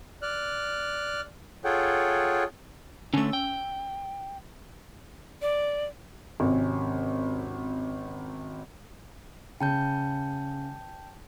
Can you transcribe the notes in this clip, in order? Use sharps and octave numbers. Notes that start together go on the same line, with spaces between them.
D5 F6 F#6
F4 G#4 A4 C#5 F#5 G5
D3 A3 C#4 E6
G5
D5
G#1 C3 C#4
C#3 G5 A5 G6